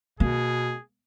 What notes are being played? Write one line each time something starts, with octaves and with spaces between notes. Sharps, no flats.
B2 A#3 G#4